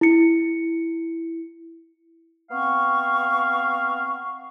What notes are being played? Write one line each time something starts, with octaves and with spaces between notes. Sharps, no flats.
E4 C#7
B3 C4 F5 C#6